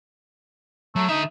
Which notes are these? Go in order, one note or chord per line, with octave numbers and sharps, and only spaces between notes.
F#3 A3
D3 D#4 E5